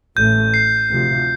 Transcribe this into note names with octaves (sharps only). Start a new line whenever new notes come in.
A1 A2 A3 G6
C7
D2 C3 F3